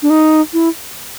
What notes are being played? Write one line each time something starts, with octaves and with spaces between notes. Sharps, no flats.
D4
D#4
E4